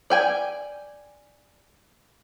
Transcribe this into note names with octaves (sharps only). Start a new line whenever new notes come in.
D5 G5 G#5